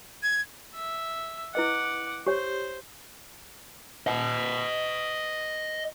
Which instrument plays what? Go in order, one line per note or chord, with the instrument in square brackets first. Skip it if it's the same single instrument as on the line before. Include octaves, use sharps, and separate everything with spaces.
[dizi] G#6
[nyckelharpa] E5
[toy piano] E4 B4 D#5 [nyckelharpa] F#5 D6
[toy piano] G4 C#5 [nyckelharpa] C5
[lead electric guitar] D#5 F#5